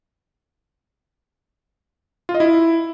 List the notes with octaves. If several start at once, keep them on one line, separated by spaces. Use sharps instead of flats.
F4
D#5
E4